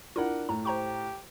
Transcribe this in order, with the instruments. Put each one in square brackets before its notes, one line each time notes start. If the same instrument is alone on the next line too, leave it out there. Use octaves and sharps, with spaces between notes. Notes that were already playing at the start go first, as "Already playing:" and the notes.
[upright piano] D4 A#4 F#5 [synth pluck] E4 F4
[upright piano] A2 [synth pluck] A#5
[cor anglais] G4 [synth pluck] C5 A#5 C#6